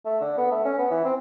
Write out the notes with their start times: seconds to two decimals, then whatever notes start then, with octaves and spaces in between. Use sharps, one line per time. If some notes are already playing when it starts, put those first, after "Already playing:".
0.06 A3
0.21 D3
0.38 B3
0.52 A3
0.65 C#4
0.78 B3
0.91 E3
1.05 C4